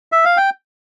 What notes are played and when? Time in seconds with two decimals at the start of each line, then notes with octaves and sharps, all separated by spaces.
0.12 E5
0.25 F5
0.37 G5